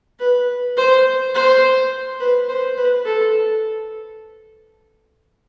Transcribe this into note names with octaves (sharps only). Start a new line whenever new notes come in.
B4
C5
C5
B4
C5
B4
A4